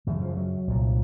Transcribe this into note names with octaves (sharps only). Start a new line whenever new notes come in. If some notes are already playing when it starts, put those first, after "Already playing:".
F#2 C#3 E3
F3
F#3
C2 A#2